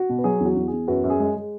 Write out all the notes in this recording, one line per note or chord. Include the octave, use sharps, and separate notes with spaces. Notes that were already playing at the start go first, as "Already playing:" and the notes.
Already playing: F#4
B2
B4
F#3 G#4
E2
F#4
E2
G#4
E2
F#2 F#4 B4
F#2
G#4
G#3
G#3